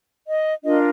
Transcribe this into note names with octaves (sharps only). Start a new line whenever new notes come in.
D#5
D4 F4 A#4 D#5